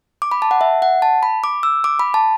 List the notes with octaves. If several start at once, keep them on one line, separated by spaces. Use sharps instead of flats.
D6
B5
A5
F#5
E5
F#5
A5
B5
D6
E6
D6
B5
A5